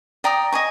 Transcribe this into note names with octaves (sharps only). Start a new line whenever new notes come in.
D5 G5 A#5 D#6
D#5 G#5 C#6